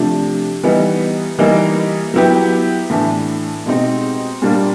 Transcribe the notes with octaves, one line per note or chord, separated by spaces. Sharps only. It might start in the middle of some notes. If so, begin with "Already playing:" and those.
Already playing: C3 F3 A3 D4
E3 G3 B3 D#4
E3 G3 A#3 D#4
F#3 B3 E4 G4
A2 E3 A3 D4
B2 G#3 C4 D#4 G4
A#2 G3 A#3 D4 F4